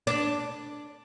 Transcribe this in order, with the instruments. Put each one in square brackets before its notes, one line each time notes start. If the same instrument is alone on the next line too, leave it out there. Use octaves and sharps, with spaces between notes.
[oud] D4